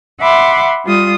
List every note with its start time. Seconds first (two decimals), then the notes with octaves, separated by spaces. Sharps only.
0.20 E5 F#5 B5 C6 D6
0.84 G3 F4 D#6